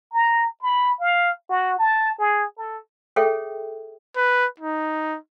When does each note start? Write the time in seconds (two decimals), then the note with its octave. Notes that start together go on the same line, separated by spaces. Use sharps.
0.14 A#5
0.62 B5
1.00 F5
1.50 F#4
1.79 A5
2.19 G#4
2.58 A4
3.16 G#4 A4 C#5 E5 G5
4.17 B4
4.60 D#4